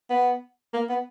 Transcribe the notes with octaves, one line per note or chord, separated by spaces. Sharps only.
B3
A#3
B3